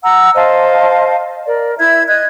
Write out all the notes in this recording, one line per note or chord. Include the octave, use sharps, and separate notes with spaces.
F#5 A#5 E6
C5 D#5 F5 A5
A#4 D5
E4 E5 G#6
D#5 F#6 G#6